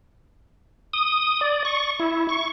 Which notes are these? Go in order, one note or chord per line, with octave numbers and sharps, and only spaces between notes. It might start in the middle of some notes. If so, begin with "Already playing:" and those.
D#6
D5
C#6
E4
C#6